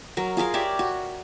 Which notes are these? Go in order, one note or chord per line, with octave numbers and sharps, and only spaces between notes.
F#3 A#4
F4 G#4 A#4 F5
G4 C#5 D5 E5
F#4